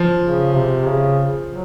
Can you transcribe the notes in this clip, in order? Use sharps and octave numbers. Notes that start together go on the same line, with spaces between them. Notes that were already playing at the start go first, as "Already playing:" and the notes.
Already playing: F3
C#3
C3
C#3
F#3